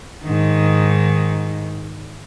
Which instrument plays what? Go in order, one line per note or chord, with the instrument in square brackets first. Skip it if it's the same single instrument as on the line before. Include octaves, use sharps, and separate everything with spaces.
[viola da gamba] G#2 D#3